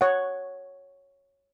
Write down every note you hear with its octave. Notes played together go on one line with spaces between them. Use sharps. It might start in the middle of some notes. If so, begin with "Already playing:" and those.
C#5 F#5